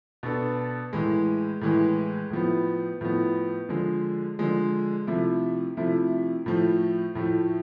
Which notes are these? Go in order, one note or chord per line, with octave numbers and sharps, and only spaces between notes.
B2 B3 D4 A4
A2 E3 G#3
A2 E3 G#3
A2 F3 B3
A2 F3 B3
D3 F3 G#3
D3 F3 G#3
C3 F3 A3 E4
C3 F3 A3 E4
A2 F3 A3
A2 F3 A3